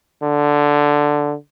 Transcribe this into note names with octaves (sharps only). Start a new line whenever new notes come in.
D3